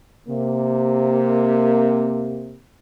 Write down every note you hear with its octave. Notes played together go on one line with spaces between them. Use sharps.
C3 A#3